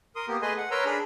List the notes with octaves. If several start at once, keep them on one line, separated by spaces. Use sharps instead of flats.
A#4 C6 D#6
A#3 B3 G4
A3 G#4 B4 D#5 G#5 C6
F#5
A#4 B4 C#5 A#5 C6 E6
D4 G#4 B5